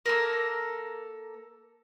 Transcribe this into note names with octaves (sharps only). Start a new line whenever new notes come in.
A#3 A4 A#4